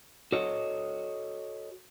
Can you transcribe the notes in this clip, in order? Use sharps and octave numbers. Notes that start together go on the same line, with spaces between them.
F#4 A4 C#5 D#5